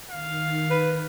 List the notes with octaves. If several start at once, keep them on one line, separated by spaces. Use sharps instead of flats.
D#3 F5
B4